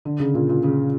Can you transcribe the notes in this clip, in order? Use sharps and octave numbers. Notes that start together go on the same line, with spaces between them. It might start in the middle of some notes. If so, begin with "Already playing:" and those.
D3
C#3
A#2
A#2
C#3